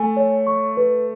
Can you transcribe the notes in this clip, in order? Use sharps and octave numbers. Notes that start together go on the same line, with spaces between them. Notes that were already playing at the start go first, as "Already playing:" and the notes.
Already playing: A3 G#5
C#5
C#6
B4